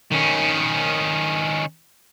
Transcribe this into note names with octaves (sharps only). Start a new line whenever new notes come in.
D#3 C#4